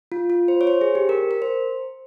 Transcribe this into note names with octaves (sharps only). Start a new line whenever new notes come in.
F4
F4
C5
C#5
C5
G#4
G4
A#4
A#4
C5